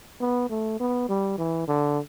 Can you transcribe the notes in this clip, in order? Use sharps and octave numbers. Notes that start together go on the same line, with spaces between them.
B3
A3
B3
G3
E3
D3